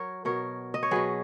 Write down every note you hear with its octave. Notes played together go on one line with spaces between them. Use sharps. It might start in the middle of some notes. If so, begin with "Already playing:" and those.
Already playing: F#3 A#4 C#5
B2 F#3 A#4 C#5
D#5
C#5
B2 F#3 G#4 B4